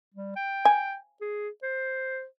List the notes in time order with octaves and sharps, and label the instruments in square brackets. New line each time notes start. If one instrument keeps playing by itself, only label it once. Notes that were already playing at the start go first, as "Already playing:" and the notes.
[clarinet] G3
G5
[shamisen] G#5
[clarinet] G#4
C5